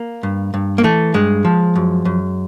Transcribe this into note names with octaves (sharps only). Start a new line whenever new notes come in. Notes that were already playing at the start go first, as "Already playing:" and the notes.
Already playing: A#3
G2
G2
A#3
E3 A3
G2 G#3
F3
F#2
F#2